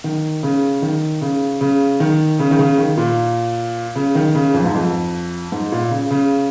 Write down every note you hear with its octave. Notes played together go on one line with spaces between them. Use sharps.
D#3
C#3
D#3
C#3
C#3
D#3
C#3
D#3
C#3
D#3
A#2
C#3
D#3
C#3
F2
G#2
F2
G#2
A#2
C#3
C#3